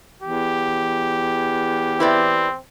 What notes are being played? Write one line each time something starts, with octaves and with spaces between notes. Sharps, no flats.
E2 G4
C4 E4 B4 D5